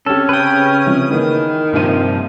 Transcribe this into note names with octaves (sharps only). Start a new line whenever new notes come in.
D3 C4 C#4 G4 A4
C#3 B4 G5 D#6
C3 F3
D#3 E3 A#3 B3
A#1 G2 C3 F3 D#7